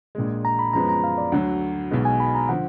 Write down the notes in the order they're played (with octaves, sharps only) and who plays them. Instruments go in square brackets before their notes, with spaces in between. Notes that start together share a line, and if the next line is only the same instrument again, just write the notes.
[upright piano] A#1 A#2 G#3
[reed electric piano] A#5
B5
[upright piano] F#2 F3 G#3 B3 [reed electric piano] A#5
[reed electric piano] A#5
F5
D5
[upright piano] D2 D3 F#3 [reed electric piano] F#5
[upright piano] B1 B2 G#3
[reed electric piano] G#5
B5
A#5
[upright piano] D3 F3 [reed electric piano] F#5